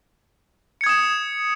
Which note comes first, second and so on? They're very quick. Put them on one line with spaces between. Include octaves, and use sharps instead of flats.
C#7 G#6 D#6 E7